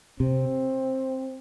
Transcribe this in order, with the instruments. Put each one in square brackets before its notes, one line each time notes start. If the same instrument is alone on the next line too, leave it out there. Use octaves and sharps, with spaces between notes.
[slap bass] C3 [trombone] C4